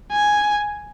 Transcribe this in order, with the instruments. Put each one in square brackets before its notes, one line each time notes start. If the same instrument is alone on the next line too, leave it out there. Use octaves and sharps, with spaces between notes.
[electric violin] G#5